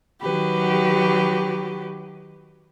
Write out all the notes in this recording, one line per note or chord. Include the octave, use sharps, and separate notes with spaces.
D#3 F#3 F#4 G4 B4